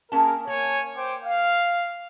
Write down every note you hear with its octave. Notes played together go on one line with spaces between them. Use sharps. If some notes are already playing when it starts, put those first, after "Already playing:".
A#3 C#4 G#4 A#4 A5
A#3 C#5 G#5
C5 G5 D6
F5